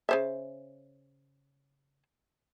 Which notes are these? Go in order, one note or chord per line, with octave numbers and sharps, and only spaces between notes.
C#3 C5 E5